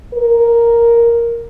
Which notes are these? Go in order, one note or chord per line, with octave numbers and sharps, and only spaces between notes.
A#4